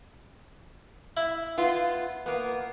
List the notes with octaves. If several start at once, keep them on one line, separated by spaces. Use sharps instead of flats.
E4
B3 F4
A#3 B3